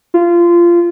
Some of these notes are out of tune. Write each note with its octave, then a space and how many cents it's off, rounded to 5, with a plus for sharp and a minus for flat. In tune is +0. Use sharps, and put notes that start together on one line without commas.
F4 -20